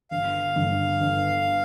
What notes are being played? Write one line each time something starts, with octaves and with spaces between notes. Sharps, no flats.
G1 F5
G2 D3
G1